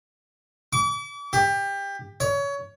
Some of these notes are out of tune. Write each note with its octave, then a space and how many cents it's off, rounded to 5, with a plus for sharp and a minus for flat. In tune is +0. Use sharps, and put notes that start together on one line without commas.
D6 -40
G4 +20
C#5 +25